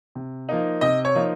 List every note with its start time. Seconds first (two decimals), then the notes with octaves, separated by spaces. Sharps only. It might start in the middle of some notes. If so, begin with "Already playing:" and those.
0.15 C3
0.49 F3 A#3 D#4
0.81 C3 D#5
1.05 C#5
1.15 F3 A#3 D#4